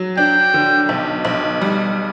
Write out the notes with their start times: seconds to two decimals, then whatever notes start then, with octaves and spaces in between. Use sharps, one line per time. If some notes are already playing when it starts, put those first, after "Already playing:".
Already playing: F#3
0.18 D4 G5
0.54 D3
0.89 B1
1.25 B1
1.61 G3